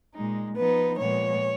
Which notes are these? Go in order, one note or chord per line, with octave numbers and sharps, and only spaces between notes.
A#2 G#3 D#4
F3 B3 D#4 B4
A#2 F3 G#3 B3 C#5